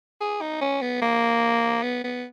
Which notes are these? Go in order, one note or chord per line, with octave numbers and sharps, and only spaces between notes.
G#4
D#4
C#4
B3
A#3
B3
B3